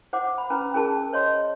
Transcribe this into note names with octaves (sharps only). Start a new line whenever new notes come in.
C5 F#5 D6
B5
C#4 B4 A#5
C#4 G#4 A#4 A5
C5 C#5 D#5 C6